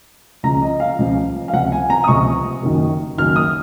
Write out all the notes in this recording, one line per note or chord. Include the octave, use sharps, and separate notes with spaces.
C#2 C#3 F3 A#5
D#5
F5
C#2 C#3 F3
F5
C#2 C3 F3 F#5
G#5
A#5
D#6
C#2 C3 F3 C#6
F#1 F#2 D#3
F#1 F#2 D#3 F6
D#6